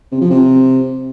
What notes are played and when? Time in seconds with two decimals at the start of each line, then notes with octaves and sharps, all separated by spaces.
0.12 C3
0.21 F3
0.30 C3